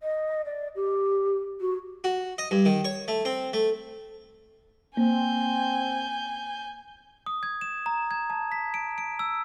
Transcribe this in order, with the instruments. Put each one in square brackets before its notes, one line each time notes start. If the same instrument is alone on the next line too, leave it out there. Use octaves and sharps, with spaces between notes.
[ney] D#5
D5
G4
F#4
[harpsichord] F#4
D#5
G2
D#3
C#5
A3
C4
A3
[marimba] A#3 [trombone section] C4 [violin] G#5 G6
[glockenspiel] D#6
G#6
E7
A#5
G#6
A5
B6
D7
D7
E6